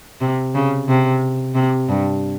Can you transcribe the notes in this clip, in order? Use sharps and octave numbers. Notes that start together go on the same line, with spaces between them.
C3
C#3
C3
C3
G2